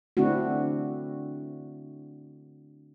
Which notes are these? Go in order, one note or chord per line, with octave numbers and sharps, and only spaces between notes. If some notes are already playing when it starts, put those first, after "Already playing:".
D3 A3 C4 D4 E4 F#4